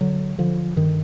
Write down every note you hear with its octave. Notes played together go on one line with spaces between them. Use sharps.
D3 F#3
D3 F3
G2 D#3